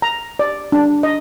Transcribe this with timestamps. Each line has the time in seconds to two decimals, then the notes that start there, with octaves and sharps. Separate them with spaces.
0.02 A#5
0.39 D5
0.72 D4
1.03 D#5